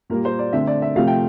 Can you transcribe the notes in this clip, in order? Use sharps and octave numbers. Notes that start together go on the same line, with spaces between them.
A#2 G3 A#3 A#4
C5
D5
D3 A3 C4 E5
D5
E5
C3 F3 A3 C4 F5
G5